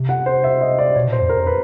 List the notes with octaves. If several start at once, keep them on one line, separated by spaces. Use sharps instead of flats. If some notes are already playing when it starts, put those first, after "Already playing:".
Already playing: C3
F#5
C5
E5
D#5
D5
B2 C#5
A#2 C5
F2
A#4
F2
B4